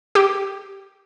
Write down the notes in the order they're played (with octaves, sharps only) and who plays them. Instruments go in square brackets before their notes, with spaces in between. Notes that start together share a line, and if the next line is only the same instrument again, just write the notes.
[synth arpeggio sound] G4